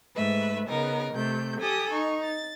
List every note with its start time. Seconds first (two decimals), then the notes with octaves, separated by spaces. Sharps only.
0.15 G#2 A3 B4 E5
0.68 C#3 B3 D#4 A#4
1.13 C3 A3 G6
1.59 G4 A4 G#5 D#6
1.91 D#4 C#6
2.24 A6